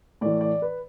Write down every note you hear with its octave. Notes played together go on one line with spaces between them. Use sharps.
A2 E3 D5
D5
B4